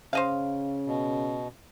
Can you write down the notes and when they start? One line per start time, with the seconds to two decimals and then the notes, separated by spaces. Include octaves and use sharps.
0.13 C#3 C5 D#5 F5
0.87 B2